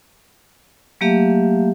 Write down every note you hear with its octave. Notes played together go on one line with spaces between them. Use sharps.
F#3 A3 A#3 G4 E5 F5